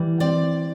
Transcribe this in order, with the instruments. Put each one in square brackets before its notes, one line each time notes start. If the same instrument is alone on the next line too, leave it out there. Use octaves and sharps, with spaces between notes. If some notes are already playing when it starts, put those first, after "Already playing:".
Already playing: [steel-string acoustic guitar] E3 G3
C4 D5